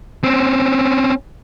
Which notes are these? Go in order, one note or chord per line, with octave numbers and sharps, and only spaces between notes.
C4 C#4